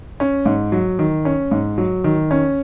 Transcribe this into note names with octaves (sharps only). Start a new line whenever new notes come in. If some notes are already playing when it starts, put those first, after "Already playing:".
C#4
G#2
F#3
D#3
C#4
G#2
F#3
D#3
C#4